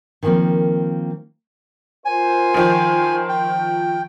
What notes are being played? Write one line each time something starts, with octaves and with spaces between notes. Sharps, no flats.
D#3 F3 A#3 C4
F4 A#4 C5 G#5
D#3 F3
G5